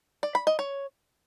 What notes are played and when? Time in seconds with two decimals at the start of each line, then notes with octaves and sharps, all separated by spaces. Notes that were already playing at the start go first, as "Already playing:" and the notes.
0.23 D5
0.35 B5
0.47 D#5
0.59 C#5